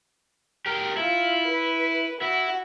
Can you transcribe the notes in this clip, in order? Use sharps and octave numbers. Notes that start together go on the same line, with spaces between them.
G4 A#4
E4 F4
B4
E4 F#4